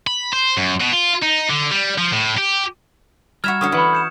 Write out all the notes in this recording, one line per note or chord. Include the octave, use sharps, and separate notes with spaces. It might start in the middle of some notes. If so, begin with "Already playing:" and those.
B5
C5
F#2
B2
F4
D#4
D3
G3
F3
A2
G4
G3 F#4 E5 A#5 F6 G#6 E7
D3 C#4 F#4 C#6 D#6
E3 A4 F#5 B5
G6 C#7 E7